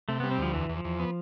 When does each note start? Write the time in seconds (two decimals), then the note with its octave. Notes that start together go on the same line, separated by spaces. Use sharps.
0.09 C3 A3
0.20 G3 B3
0.31 C4
0.38 D2 F3
0.54 E2 E3
0.69 E2
0.76 F3
0.85 E2
0.99 B3